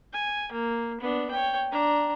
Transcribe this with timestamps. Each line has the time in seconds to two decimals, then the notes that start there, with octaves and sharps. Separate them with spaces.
0.13 G#5
0.52 A#3
1.01 B3 D4
1.31 C#5 G5
1.71 D4 A#5